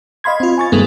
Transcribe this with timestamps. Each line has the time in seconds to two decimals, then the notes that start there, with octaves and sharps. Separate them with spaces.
0.24 D#5 F5 B5 C6 G#6
0.40 C4 F4
0.58 G#5 C#6 A6
0.72 G2 D#3 F#3 G#3 A3 B3